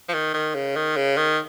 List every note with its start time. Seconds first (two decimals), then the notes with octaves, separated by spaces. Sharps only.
0.09 F3
0.14 D#3
0.34 D#3
0.55 C#3
0.76 D#3
0.96 C#3
1.17 D#3